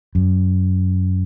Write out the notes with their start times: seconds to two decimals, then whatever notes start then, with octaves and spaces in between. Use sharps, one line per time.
0.15 F#2